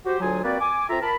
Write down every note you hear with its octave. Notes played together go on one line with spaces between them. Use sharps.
F#4 G4 C5
D2 F#3 F4 G#4 G#5
A#3 C4 F#4 B4 D5
G#5 D6
C4 F4 A4 E5 A#5
A#4 A5 B5